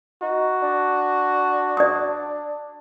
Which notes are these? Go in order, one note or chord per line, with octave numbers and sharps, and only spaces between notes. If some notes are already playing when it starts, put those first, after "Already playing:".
D#4 F#4
D4
D5 D#6